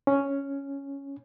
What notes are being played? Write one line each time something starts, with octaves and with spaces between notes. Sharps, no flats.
C#4